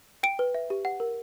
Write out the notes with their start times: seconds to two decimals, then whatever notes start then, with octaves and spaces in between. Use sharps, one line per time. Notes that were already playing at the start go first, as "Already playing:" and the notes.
0.23 G5 D7
0.39 B4
0.54 E5
0.70 G4
0.85 F#5
1.00 A#4